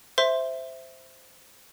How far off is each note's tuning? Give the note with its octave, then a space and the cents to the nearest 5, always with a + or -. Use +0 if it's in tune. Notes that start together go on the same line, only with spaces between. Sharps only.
C5 -5 E5 +0 C6 +0